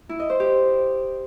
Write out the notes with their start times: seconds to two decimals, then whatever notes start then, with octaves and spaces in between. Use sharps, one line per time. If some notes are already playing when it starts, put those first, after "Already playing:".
0.09 E4
0.20 D#5
0.30 C5
0.40 G4